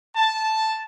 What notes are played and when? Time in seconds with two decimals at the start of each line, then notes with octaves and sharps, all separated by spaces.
0.16 A5